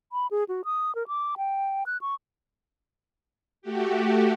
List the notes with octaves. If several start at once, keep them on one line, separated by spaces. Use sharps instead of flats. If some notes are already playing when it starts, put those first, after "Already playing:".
B5
G#4
F#4
D#6
A#4
D6
G5
F#6
C#6
A3 F#4 G4